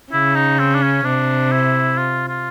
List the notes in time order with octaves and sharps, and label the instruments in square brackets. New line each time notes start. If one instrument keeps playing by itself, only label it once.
[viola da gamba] C#3 [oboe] E4
[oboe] D#4
C4
D4
C#4
[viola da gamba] C3 [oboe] D4
[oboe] E4
F4
F4